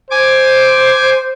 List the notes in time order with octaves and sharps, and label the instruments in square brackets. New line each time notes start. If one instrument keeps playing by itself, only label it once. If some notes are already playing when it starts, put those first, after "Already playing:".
[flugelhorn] C5 [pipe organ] G#5 D6